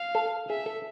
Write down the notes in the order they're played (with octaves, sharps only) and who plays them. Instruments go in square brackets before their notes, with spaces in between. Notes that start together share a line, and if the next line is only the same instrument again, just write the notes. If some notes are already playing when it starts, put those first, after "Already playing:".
Already playing: [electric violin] F5
[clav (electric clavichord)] A4
[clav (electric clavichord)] G#4 [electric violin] E5
[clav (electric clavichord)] A4